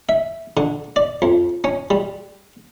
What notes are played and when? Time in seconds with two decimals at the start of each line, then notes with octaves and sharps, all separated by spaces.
0.09 E5
0.57 D3
0.96 D5
1.22 F2
1.64 C#4
1.90 G3